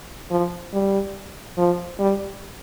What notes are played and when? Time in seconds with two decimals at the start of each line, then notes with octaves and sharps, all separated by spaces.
0.31 F3
0.74 G3
1.58 F3
1.99 G3